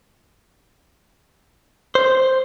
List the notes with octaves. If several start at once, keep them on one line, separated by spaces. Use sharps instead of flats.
C5